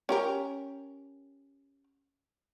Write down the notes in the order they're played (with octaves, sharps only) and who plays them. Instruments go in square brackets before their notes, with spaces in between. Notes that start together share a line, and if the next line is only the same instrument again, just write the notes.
[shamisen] C#4 G4 A#4